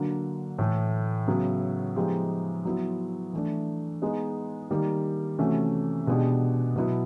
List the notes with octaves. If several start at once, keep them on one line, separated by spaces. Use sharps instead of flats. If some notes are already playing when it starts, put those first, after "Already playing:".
Already playing: D3 F#3 A#3
A2 E3 A3
C#3 F#3 B3
F3 G#3 B3 D#4 G4
F#3 B3 E4
E3 A3 D4
G#3 B3 D#4 G#4
D#3 G3 A#3
C3 E3 A3 C#4 F#4
B2 G#3 B3 D4 G4
B2 F#3 B3 E4